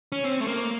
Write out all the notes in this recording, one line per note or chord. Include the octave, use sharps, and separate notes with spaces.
C#4
C4
A3
A#3